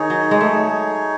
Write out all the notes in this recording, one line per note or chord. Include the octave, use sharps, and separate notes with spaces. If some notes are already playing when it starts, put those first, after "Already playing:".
Already playing: D#3 D#4 G#4 C#5
F#3
G#3
A3